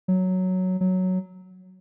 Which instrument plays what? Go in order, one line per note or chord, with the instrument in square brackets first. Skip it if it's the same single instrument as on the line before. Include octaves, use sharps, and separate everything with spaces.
[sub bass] F#3
F#3